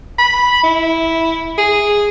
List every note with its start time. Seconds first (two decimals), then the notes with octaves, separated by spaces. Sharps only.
0.18 B5
0.63 E4
1.58 G#4